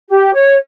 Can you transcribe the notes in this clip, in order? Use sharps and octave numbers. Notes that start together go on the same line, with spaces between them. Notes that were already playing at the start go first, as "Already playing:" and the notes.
G4
C#5